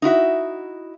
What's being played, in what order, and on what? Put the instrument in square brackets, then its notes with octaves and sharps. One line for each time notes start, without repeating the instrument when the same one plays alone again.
[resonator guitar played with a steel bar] D#4 E4 F#4 E5